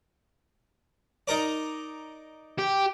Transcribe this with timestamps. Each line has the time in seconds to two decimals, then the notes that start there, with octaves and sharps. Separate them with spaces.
1.28 D#4 A#4 D5
2.58 G4